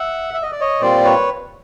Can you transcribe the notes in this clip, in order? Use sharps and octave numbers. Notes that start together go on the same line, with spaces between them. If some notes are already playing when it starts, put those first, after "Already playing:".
Already playing: E5 F#5
E5
D#5
D5
C#5 D#5
A#2 G3 C4 F4 C5 D5
B4 C#5